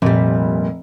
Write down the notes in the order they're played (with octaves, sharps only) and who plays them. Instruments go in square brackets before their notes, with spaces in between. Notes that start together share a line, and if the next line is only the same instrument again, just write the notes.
[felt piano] F1 [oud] A#2 G3